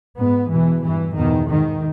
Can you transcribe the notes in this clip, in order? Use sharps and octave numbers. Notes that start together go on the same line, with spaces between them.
G#2 B3
E2 B2 E3
G2 E3
E2 B2 D#3
G#2 D#3